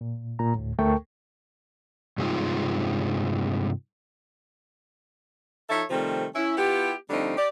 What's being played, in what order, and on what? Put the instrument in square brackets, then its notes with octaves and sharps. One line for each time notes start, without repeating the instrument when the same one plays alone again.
[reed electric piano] A#2
A#2 A#5
D2 A2
D2 A3 A4 A#4 G5 C#6
[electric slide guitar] G2 C3 G#3 C4 D#4 F4
[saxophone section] F3 D#4 A4 C#5 E5
C3 D#3 F3 G3 A3 C4
C#4 E4
B3 E4 F4 G4
D3 F3 G3 A3 C4 D#4
G4 D5